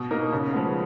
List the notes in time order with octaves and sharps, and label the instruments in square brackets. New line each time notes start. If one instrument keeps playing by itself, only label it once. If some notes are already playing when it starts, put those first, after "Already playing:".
Already playing: [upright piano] B2
A#3 D#4 A#4
C#3
F3 G#3 B3